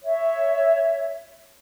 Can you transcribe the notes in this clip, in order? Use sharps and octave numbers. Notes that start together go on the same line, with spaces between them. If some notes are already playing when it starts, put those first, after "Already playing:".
C#5 E5